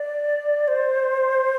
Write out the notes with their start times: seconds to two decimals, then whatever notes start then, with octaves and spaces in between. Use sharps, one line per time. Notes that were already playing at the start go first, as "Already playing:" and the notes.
Already playing: D5
0.68 C5